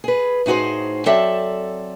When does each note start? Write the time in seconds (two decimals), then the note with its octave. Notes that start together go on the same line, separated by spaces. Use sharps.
0.04 G#4 B4
0.46 A2 D#4 F#4 G#4 C5
1.06 F#3 C4 A4 D5 E5